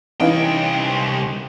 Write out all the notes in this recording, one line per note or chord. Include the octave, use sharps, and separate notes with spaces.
C2 E3 C#4 D#4 E4 B4 F5 G5